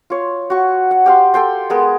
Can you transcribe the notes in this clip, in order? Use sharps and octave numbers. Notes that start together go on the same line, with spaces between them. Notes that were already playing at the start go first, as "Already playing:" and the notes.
F4 C#5
F#4 C#6
F#5
G4 F5 C6
A4 G5 C6
G#3 B3 G#4 A#4